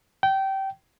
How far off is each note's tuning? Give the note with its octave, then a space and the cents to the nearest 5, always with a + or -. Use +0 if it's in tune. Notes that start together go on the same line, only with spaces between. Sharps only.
G5 -20